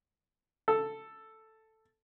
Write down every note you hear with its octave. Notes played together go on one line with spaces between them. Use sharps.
A4